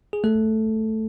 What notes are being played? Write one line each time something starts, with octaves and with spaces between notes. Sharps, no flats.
G#4
A3 A4